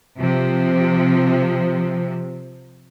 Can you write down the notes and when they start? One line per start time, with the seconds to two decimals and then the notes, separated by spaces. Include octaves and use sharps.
0.19 C3 F3